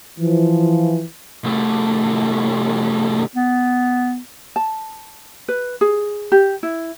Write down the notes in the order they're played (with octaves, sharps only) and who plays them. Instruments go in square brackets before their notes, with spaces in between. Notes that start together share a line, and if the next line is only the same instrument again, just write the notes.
[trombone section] E3 F3
[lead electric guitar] C2 A3
[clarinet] B3
[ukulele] A5
B4
G#4
G4
E4